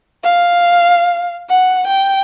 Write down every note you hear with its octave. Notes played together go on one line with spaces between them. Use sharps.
F5
F#5
G5